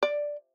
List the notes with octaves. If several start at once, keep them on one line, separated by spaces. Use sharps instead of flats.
D5